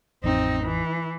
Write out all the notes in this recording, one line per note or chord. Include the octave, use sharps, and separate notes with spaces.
A1 F2 C4 D#4
E3